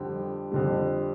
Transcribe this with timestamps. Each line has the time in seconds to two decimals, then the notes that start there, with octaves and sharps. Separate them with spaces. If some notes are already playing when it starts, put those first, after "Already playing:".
Already playing: F2 D3 G3 G5
0.52 F2 D3 G3